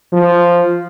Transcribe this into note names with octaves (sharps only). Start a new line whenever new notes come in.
F3